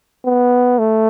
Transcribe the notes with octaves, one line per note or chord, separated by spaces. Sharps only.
B3
A3